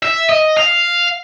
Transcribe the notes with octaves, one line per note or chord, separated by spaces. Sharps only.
E5
D#5
F5